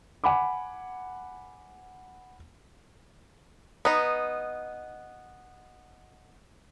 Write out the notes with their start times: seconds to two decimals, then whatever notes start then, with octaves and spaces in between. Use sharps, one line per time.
0.24 F#5 G#5 B5 D6
3.85 B3 D#4